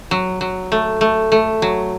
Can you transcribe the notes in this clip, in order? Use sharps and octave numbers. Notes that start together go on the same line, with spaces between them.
F#3
F#3
A3
A3
A3
F#3